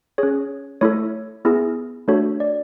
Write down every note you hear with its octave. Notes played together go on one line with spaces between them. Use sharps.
C#4 G#4 C#5
A3 E4 A4 C#5
B3 E4 G#4
A3 D4 F#4 A4 C#5
D5